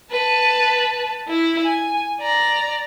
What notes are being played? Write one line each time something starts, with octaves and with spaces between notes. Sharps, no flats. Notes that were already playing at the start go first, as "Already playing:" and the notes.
B4 A5
E4
G#5
D5 A#5